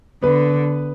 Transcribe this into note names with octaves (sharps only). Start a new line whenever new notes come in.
D3 B3 B4